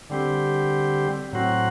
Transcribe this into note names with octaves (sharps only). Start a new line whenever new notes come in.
D3 G3 C4 G4
A2 F#3 C4 F#4